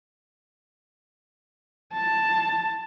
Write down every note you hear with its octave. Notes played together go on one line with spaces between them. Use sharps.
A5